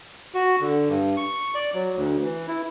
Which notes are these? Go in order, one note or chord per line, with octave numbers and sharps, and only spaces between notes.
F#4
D3
G2
C#6
D5
F#3
D2
E3
E4